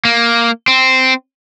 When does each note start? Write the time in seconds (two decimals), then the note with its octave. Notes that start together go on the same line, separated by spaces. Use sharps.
0.05 A#3
0.68 C4